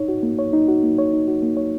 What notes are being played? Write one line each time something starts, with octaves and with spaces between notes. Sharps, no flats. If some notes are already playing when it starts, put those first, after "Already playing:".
Already playing: D#4 C#5
F#4
A#3
C#5
D#4
F#4
A#3
C#5
D#4
F#4
A#3
C#5